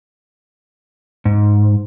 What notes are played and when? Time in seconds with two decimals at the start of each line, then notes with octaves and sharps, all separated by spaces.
1.25 G#2